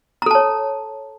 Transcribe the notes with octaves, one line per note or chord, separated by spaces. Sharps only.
A4 C#5 A5 A#5